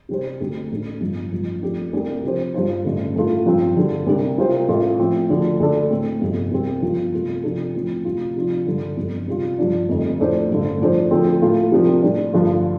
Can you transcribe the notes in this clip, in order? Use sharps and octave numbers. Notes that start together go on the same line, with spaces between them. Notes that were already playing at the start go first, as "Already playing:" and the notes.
C3 G3 C4 G4 C5
D2 D3 G3 C4 G4
A1 A2 A3 D4
G1 G2 F3
A1 G2 F3
F2 F3 A3 D4 G4
C2 C3 A3 D4 G4
C3 F3 C4 G4 C5
G2 G3 F4 C5
A1 G2 D3
A1 A2 A3 F4
G2 F3 C4
G2 D3 G3
C2 C3 G3 D4
C2 C3 G3 F4 C5
A1 A2 A3 F4
A2 F3 C4
D2 D3 F3 D4 A4
D2 D3 A3 D4 A4
A2 A3 C4
G1 F2 C3
C2 C3 G3 C4
G1 G2 F3 C4 F4
C3 A3 F4
C3 F3 D4 F4 A4
A1 A2 F3 C4
D2 C3 G3 F4
C3 F3 D4 F4
G2 D3 G3
G1 F2 D3 G3
C3 G3 F4
G2 F3 D4
F1 F2 D3
A2 F3 D4 A4 C5
A1 G2 D3
A2 F3 D4 A4 C5
D2 D3 F3 A3 C4
A2 A3 F4
C2 C3 F3 D4
A2 G3 D4
G2 D3 F3 A3 F4